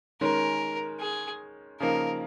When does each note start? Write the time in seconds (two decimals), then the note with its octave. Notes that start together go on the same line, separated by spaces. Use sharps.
0.21 D#3 G#3 C#4 A#4
1.01 G#4
1.80 C#3 F3 A#3 D#4 A#4